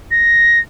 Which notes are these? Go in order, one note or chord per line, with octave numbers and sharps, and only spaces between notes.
A#6